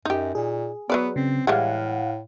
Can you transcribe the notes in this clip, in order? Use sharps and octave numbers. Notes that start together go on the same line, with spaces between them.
F#2 D#4 G4
A#2 G#4
F#3 B3 B4 D5
C#3 C4
A2 E3 G3 G#3 F5 F#5